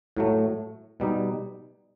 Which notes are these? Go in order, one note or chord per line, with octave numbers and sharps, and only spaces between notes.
A2 F#3 A3
B2 G3 D#4